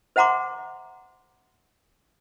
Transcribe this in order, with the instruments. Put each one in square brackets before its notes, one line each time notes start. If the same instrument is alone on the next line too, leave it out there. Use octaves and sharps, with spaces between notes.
[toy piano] C5 E5 F#5 A#5 C6 D6